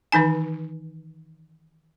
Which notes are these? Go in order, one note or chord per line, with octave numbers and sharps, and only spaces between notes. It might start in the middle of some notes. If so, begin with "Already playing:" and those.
D#3 E3 D#4 G#5